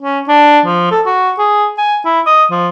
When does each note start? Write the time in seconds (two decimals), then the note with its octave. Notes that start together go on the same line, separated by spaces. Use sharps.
0.02 C#4
0.28 D4
0.66 F3
0.91 A4
1.06 F#4
1.39 G#4
1.78 G#5
2.05 E4
2.26 D#5
2.51 F3